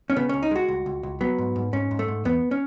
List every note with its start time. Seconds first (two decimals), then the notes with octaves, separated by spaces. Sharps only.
0.10 C#4
0.16 C#3 B3
0.29 C#2 C#4
0.42 D#4
0.51 G#3 F#4
0.68 C#2
0.86 C#2
1.03 C#2
1.21 F#3 B3
1.38 G#2
1.56 G#2
1.73 G#2 C#4
1.91 G#2
1.99 A3
2.08 G#2
2.25 E2 B3
2.51 C#4